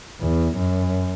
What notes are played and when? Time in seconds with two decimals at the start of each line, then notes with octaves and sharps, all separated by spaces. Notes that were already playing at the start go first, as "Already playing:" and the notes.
0.21 E2
0.56 F#2